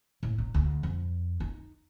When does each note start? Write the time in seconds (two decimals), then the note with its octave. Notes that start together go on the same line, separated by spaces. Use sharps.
0.23 A2
0.38 D#4
0.54 D2
0.83 F2
1.40 D#4